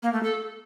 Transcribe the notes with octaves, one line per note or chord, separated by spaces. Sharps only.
A#3
A3
A4